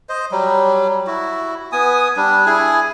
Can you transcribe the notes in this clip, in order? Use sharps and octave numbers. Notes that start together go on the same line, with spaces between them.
C5 D#5
F#3 G3
E4 F#4
B3 G#5 D#6
G3 D4
E4 G#4 G#5